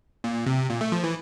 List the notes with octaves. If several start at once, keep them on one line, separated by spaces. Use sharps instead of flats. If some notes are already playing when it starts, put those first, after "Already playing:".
A#2
C3
A#2
A3
F3
E3